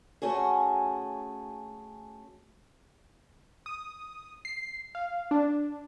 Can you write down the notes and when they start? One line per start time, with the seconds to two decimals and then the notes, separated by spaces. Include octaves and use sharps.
0.22 A3 C#4 F#4 G#4
3.66 D#6
4.45 C7
4.95 F5
5.31 D4